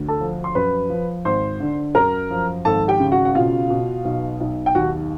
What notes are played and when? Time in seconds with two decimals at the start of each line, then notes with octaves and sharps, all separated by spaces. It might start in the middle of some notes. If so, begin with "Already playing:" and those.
Already playing: D2
0.08 A4 A5
0.20 F3
0.44 C6
0.55 F#2 B4 B5
0.90 F3
1.25 G#1 C5 C6
1.60 D3
1.95 F#2 A#4 A#5
2.30 F3
2.65 G#1 A4 A5
2.88 G4 G5
3.00 C#3
3.12 F#4 F#5
3.25 F#5
3.35 B2 F4 F5
3.70 B2
4.05 B1
4.41 B1
4.66 G5
4.75 D#2 F#4 F#5